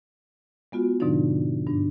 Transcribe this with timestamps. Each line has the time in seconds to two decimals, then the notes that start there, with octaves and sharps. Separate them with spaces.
0.72 G#3 B3 F4 F#4
1.00 G#2 B2 D3 F3 D4 D#4
1.67 G2 D4